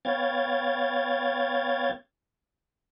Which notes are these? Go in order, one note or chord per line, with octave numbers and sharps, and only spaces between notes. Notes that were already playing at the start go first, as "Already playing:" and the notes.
B3 C#5 F5 G5 G#6 A6